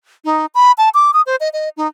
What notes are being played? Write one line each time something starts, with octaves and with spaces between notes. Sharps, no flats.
D#4
B5
A5
D6
D#6
C5
D#5
D#5
D#4